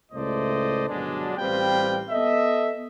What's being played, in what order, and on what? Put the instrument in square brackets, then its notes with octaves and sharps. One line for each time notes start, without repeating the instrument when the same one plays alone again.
[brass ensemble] C#2 A2 A3 C5 D5 D#5
G1 B2 F#3 G#3 D4
A1 G3 C4 F4 B4 G5
B3 A4 D#5 E5